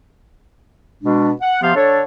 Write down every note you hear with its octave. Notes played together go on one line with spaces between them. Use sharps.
B2 G#3 D4
F#5
C3 F3 B3 G4 F5 C6
D3 D4 A4 C#5